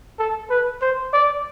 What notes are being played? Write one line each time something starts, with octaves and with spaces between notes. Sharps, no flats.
A4
B4
C5
D5